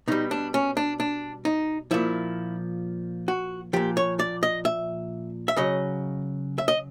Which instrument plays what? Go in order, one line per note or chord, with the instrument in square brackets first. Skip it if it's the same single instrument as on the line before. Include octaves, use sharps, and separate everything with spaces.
[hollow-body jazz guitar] B2 G3 D#4
D4
C#4
D4
D4
D#4
A#2 F3 E4
F#4
A#2 F3 G4
C#5
D5
D#5
E5
E5
C#3 F#3 D#5
E5
D#5